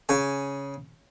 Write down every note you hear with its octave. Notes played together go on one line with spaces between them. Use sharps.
C#3 G#5